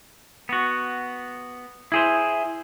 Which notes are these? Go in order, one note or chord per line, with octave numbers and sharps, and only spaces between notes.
B3 F#4
E4 G#4 C5